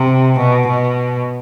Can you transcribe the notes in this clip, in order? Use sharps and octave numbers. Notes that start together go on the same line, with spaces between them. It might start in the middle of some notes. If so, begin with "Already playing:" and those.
Already playing: C3
B2
B2